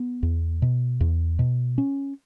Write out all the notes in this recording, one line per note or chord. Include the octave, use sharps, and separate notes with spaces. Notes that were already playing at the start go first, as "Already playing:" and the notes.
Already playing: B3
E2
B2
E2
B2
C#4